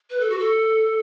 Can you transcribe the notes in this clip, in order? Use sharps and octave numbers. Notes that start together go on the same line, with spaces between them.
B4
A4
F#4
A4